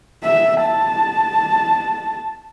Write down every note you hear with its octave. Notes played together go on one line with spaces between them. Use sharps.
E5
A5